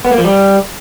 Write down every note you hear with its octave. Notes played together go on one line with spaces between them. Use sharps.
B3
A#3
F3
G3